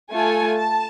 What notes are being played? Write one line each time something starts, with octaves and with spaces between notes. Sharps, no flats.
A3 F4 A4 G#5
A5